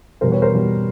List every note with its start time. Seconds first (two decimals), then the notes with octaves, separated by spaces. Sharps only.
0.21 E2 B2 G3 A#4 C5
0.32 B4 C#5
0.42 A#4 C5
0.52 E2 B2 G3